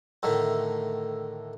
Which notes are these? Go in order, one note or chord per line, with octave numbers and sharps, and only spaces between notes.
A2 D3 D#3 A3